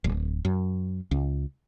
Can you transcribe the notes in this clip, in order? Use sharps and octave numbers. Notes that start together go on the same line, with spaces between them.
D1
F#2
C#2